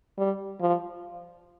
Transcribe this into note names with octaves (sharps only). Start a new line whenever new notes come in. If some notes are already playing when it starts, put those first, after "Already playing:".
G3
F3